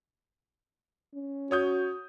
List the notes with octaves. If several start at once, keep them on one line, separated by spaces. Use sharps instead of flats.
C#4
F#4 C#5 D#6 G6